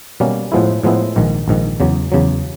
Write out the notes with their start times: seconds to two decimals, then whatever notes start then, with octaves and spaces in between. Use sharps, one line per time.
0.20 B2 G3 A#3 C#4
0.52 A2 F3 G#3 B3 E4
0.83 A2 F3 G#3 B3 E4
1.16 A#1 G#2 D#3
1.48 A#1 G#2 D#3
1.80 E2 C#3 F#3
2.12 E2 C#3 F#3